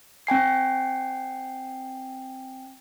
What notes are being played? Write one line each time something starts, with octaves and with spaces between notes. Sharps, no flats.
C4 G5 G#5 C7